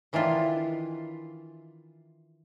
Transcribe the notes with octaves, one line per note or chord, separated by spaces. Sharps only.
D#3 E3 D4 E4 F4